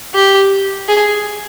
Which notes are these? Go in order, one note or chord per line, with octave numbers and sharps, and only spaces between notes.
G4
G#4